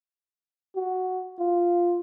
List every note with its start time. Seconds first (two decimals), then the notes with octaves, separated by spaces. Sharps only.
0.76 F#4
1.39 F4